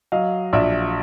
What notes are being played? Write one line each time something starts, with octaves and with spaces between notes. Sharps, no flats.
F#3 D#5 F5
A#1 D5 E5